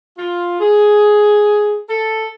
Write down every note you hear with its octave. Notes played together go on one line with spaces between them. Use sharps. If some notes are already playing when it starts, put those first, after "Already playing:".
F4
G#4
A4